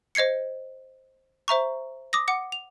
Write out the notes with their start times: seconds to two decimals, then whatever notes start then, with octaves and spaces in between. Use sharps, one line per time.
0.15 C5 D#5 G#6 C7 C#7
1.48 C5 E5 A#5 C#6
2.13 D6 D#6 A#6
2.28 F#5 D6 C#7
2.52 F7